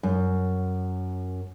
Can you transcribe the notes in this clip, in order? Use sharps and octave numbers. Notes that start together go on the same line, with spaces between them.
F#2